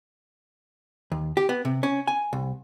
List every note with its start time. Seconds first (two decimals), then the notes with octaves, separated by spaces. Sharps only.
1.12 D#2
1.37 G4
1.49 B3
1.65 C3
1.83 C#4
2.07 G#5
2.33 C2